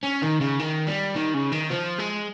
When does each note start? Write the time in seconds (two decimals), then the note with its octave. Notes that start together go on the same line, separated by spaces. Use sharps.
0.03 C#4
0.22 D#3
0.41 C#3
0.59 D#3
0.87 G3
1.16 D#3
1.34 C#3
1.53 D#3
1.71 F3
1.99 G#3